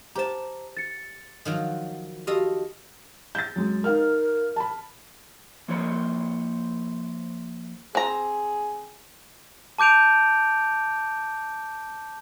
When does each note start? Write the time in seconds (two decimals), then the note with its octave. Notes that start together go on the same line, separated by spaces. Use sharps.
0.15 G4 C5 A5 A#5
0.77 A6 C#7
1.45 D#3 F3 F#3
2.27 F#4 G4 A4 D#5 F5
3.35 G6 A6
3.56 F#2 G#3
3.84 D#4 A#4 F5 F6
4.56 A5 B5
5.68 F3 A#3 E4 C5 C#5
7.95 C4 G#4 A#5
9.78 A5 D6 G6 D7 F7